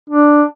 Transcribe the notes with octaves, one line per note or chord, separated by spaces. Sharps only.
D4